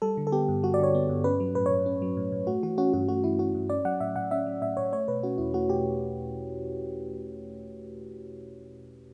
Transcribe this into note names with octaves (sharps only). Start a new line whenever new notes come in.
G3 A4
D3
A4
B3 G4
G2
G3 F#4
D5
D3 C#5
B3
G2
C#4 B4
F#3
A2 B4
C#5
A2
C#4
F#3
A2
A2
A3 F#4
E3 F#4
C#4 F#4
G2 F#4
A3 F#4
E3 E4
C#4 F#4
G2
C#4 D5
F#3 F#5
A2 E5
A2 F#5
C#4 E5
F#3
A2 E5
A2 C#5
A3 C#5
B2 B4
C#4 F#4
E2 E4
A3 F#4
B2 G4